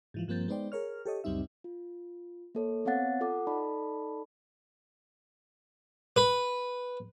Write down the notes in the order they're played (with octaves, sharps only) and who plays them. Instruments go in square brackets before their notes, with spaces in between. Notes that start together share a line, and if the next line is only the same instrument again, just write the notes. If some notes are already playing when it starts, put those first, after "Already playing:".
[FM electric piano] G#2 E3 F3
G2 F3 A#3 C4 G6 A6
G#3 B3 D#4 C5 D5 G5
G#4 A#4 C#5 F6
G4 A4 C#5 D#5
C#2 F#2 G3 C4 D#4 E5
[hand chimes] F4
A#3 A4 C#5
B3 C4 C#5 F5 F#5 A6
F4 A4 F#5 D6
D#4 A4 D5 A5 B5
[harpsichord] B4